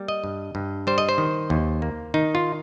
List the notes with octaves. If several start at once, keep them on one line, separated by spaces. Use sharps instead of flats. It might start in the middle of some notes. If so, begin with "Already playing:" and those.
Already playing: G3 A#3
D#5
G2
G2
G3 C5
D#5
C5
D#3
D#2
A#3
D#3 D#4
F4